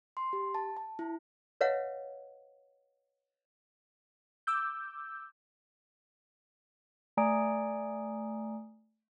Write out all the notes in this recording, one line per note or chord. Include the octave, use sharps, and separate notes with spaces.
C6
G4
A5
A5
E4
B4 C#5 D#5 F5 F#5
D6 E6 G6
A3 D5 G#5 A#5 D#6 D7